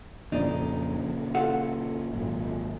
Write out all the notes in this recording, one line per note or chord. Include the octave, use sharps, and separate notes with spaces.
F2 A#2 C#3 D4 D#4
F4 A4 F#5
G#1 A#2 F#3